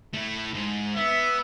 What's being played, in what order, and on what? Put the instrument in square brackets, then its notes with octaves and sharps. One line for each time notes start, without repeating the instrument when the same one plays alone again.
[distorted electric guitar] A3 E4
G#2
[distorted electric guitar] B3 [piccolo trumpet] E5